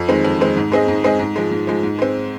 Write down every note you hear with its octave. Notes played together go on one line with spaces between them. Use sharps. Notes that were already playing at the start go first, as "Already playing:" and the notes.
Already playing: F2
D#3 G#3 C4
F2
D#3 G#3 C4
G#2
G#3 C4 G#4 D#5
G#2
G#3 C4 G#4 D#5
G#2
F3 G#3
G#2
F3 G#3
G#2
G#3 C4